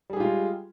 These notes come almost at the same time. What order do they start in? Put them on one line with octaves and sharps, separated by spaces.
G3 G#4 G4 F4 G#3